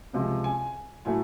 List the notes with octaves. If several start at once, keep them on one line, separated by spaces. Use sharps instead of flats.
C#2 C3 F3 G#3
G#5
A2 F#3 A3 G#5